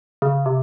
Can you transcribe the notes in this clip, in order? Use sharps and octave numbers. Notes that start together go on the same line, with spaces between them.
C#3
C3